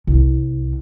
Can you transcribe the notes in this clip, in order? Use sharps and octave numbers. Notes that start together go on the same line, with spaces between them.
C2